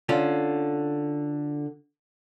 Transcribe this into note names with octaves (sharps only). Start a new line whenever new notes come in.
D3 C#4 F4